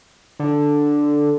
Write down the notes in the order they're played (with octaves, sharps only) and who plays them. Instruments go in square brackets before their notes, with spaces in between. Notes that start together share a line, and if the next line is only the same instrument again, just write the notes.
[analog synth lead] D3